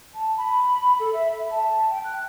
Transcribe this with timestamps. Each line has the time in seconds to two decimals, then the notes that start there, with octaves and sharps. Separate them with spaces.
0.14 A5
0.37 B5
0.99 A4
1.13 E5
1.32 E5
1.50 A5
1.89 G5
2.04 F#6